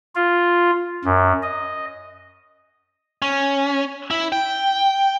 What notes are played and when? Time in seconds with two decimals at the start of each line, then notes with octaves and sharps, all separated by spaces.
0.15 F4
1.05 F#2
1.43 D#5
3.22 C#4
4.11 E4
4.32 G5